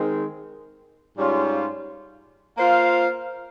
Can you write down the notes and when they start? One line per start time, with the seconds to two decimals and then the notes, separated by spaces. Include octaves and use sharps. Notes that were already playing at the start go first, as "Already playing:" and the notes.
Already playing: D#3 G#3 C4
1.17 G#2 G3 C#4 F4
2.58 A#3 F4 C5 F5